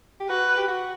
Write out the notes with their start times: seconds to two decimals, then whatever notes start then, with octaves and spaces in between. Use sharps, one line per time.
0.20 G4
0.29 F#4 B4
0.57 G4
0.68 F#4